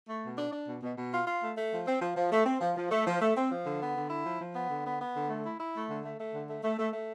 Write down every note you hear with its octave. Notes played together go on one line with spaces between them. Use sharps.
A3
B2
D4
D4
B2
B2
B2
F4
F4
A3
A3
F3
C4
F3
F3
A3
C4
F3
F3
A3
F3
A3
C4
F3
D3
B3
D3
E4
F3
F3
B3
D3
B3
B3
D3
A3
E4
E4
A3
D3
A3
A3
D3
A3
A3
A3
A3